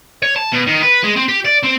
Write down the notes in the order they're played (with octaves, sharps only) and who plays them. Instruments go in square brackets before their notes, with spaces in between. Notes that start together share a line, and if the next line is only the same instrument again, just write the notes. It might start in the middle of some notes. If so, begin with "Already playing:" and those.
[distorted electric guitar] C#5
A5
B2
D#3
B4
G#3
C4
G4
D5
C4